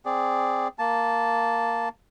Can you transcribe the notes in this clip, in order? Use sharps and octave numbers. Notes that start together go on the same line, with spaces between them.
C4 G#4 D5
A#3 A5